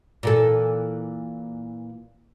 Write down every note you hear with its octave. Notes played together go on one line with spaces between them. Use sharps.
A#2 E3 A4